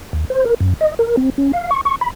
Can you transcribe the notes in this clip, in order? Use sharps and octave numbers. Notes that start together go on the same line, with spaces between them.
D#2
C5
A#4
F#2
D#5
A#4
C4
C#4
F5
C#6
C#6
B5